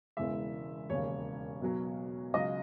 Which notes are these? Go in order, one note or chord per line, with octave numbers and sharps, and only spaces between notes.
E1 E2 C#3 E3 G#3 E5
E1 D#2 C#3 C#5
B1 B2 F#3
C#2 C#3 F#3 D#5